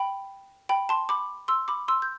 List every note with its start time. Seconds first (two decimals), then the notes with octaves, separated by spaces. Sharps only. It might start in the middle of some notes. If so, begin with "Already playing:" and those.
Already playing: G5 B5
0.69 G5 B5
0.89 A5 C6
1.09 B5 D6
1.48 C6 E6
1.68 B5 D6
1.88 C6 E6
2.02 G6